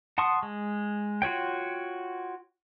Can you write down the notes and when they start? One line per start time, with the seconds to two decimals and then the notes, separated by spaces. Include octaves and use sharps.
0.18 F#5 A5 C6 C#6 D#6
0.43 G#3
1.22 F4 F#4 C#5 G5